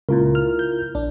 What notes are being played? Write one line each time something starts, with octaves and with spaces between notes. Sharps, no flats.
C#2 A#2 E4 F4 A#4
F6
G6
A#1 D4